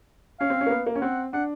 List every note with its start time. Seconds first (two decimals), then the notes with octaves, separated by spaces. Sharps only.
0.40 C#4 F5
0.50 C4
0.61 C#4
0.67 A#3
0.70 B3
0.86 A#3
0.95 C#4
1.01 C4 F#5
1.33 D4 F#5